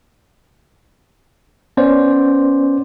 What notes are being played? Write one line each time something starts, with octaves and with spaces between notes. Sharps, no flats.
B3 C#4 C5 D5